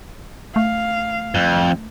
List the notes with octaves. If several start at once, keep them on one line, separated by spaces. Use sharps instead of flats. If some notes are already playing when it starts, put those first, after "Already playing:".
A3 F5
F2